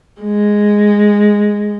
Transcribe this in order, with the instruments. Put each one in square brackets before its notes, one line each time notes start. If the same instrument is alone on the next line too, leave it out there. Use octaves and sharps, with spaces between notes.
[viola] G#3